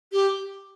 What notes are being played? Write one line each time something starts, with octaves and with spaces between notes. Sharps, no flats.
G4